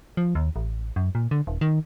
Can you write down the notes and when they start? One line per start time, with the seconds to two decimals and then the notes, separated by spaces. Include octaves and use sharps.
0.17 F3
0.35 D#2
0.56 A1
0.96 F#2
1.15 A#2
1.31 D3
1.47 D#1
1.61 D#3